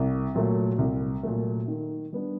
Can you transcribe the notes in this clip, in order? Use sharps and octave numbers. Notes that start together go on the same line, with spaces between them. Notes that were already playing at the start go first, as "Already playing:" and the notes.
Already playing: C2
A#2 F#3 A3
C2
A#2 F#3 A3
D#3
G3 B3 D4